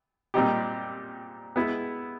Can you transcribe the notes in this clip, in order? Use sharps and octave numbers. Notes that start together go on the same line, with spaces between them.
A#2 G3 C4 D#4 G4
G#3 B3 E4